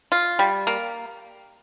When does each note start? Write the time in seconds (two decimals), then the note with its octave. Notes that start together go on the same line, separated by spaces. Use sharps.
0.12 F4
0.39 G3
0.67 A#3